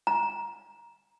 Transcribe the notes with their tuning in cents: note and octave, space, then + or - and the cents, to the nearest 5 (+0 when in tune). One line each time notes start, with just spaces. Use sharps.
A#5 +15